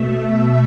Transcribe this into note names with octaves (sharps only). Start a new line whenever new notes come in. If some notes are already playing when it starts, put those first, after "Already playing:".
Already playing: B2 A3 E5